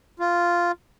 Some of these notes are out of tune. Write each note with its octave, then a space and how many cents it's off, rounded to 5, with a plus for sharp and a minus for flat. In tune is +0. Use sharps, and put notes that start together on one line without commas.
F4 -5